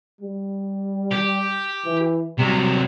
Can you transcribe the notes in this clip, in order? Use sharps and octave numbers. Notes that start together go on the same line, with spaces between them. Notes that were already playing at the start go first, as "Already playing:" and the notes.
G3
G4
E3
C3 F#3 G3